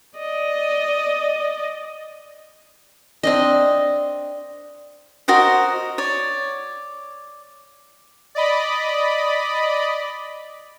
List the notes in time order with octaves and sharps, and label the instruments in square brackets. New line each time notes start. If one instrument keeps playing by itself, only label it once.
[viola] D5 D#5
[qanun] C4 D4 D#5
[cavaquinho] F#4 A#4 C5 D#5
C#5 D5
[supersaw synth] D5 D#5 B5